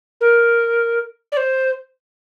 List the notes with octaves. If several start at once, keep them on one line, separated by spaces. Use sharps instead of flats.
A#4
D5
C5